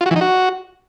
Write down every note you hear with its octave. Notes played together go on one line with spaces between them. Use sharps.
F4
F#4
E3
D#4
F#4